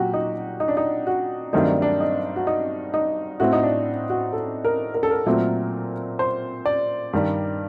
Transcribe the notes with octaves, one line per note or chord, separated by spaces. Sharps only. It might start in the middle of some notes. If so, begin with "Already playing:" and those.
Already playing: A#2 F#3 F#4 G4
D#4
D#4
D4
D#4
F#4
G2 D#3 F#3 A3 C4 D#4
D4
D4
D#4
F#4
D#4
D#4
A2 A3 C4 F#4
D#4
D4
F#4
A4
A#4
A#4
A4
A#4
A#2 F#3 A3 C4
C5
D5
G2 D#3 G3